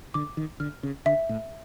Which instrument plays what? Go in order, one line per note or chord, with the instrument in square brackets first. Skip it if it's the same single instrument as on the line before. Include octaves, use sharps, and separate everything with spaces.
[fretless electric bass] D3 [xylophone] D6
[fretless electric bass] D#3
[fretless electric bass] D3 [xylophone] F6
[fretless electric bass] C#3
[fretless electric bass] D3 [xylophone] E5
[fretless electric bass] A2